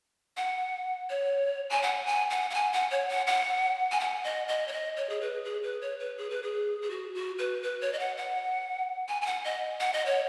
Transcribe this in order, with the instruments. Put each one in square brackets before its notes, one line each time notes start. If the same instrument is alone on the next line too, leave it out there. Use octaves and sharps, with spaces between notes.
[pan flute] F#5
C#5
G#5
F#5
G#5
F#5
F#5
G#5
F#5
C#5
F#5
F#5
G#5
F#5
D#5
D#5
C#5
D#5
C#5
G#4
B4
G#4
B4
C#5
B4
G#4
B4
G#4
G#4
F#4
F#4
B4
B4
C#5
D#5
F#5
F#5
G#5
G#5
F#5
D#5
F#5
D#5
C#5